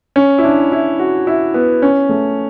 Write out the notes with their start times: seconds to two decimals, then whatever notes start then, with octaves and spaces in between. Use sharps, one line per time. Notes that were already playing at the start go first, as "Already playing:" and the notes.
0.16 C#4
0.38 E4
0.44 D4
0.72 E4
0.99 F#4
1.27 E4
1.54 B3
1.82 C#4
2.09 A3